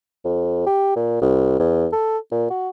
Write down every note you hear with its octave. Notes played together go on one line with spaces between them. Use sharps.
F2
G4
A#2
C2
E2
A4
A#2
F#4